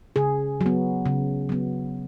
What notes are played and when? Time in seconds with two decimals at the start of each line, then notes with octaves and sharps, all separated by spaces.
0.16 C#3 G#4
0.61 F#3
0.66 B3
1.06 C#3
1.49 F#3 B3